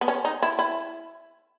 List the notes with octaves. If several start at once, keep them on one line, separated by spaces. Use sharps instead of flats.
B3
C#4
D#4
E4
E4